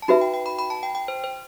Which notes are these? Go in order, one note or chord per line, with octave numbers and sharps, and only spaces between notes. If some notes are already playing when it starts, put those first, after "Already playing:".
A5
D#4 F#4 B4 E5 B5
G5
G5
B5
B5
A5
G5
G5
C5
C5